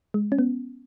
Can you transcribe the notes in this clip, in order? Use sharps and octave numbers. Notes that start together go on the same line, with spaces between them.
G#3
C#4
B3